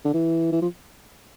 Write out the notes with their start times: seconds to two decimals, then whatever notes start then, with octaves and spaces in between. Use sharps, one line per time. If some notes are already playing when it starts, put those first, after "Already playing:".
0.05 D3
0.14 E3
0.52 E3
0.62 F3